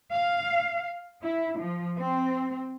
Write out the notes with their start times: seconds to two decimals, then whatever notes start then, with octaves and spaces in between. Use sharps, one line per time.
0.11 F5
1.22 E4
1.58 F3
1.99 C4